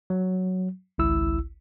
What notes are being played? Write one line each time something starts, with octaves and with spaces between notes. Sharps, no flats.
F#3
G#1 C#2 E4 E6